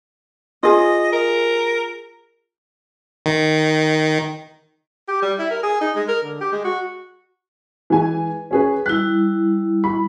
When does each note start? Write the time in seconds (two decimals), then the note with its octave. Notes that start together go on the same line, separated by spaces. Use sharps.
0.63 F4 G#4 D#5
1.12 A#4
3.26 D#3
5.08 G4
5.23 G3
5.39 E4
5.51 A#4
5.63 G#4
5.81 D#4
5.96 G#3
6.08 A#4
6.23 D3
6.41 G4
6.53 G#3
6.64 F#4
7.90 E3 G#3 G#5
8.51 C#4 G#4 B4
8.86 G3 E4 F#6
9.84 B5